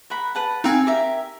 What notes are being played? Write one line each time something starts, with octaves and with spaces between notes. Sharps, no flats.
A#4 F#5 B5
B4 F#5 A5
C4 D#4 F5 G#5
G4 A#4 E5